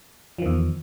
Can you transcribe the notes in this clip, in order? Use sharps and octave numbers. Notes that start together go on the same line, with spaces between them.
E2 D#3 F3